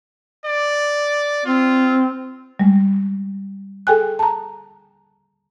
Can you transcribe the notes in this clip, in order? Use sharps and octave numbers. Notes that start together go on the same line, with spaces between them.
D5
C4 F4
G3 G#3
G#4 A4 G5 G#5 F#6
A5 A#5